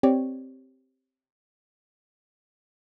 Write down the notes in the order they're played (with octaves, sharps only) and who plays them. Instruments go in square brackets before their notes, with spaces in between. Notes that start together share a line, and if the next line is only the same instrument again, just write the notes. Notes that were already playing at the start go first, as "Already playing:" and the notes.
[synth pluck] C4 G4 C#5 D5